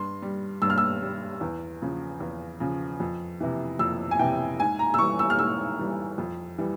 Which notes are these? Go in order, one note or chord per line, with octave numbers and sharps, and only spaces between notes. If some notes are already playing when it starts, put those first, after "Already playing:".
Already playing: G2 C6
G3
G2 E6
F6
E6
G3
E2
C#3 F3
E2
C#3 F3
F2
C3 E3
F2 E6
G#5
C3 E3 G5
G#2 G#5
A#5
E6
E3 G3 C#6
E6
F6
G#2 E6
E3 G3
F2
E3 G3